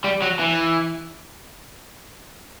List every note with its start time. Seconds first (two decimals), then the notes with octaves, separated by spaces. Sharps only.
0.04 G3
0.22 F#3
0.39 E3